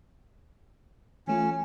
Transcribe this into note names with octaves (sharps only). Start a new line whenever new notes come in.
E3 A3 C#4 F4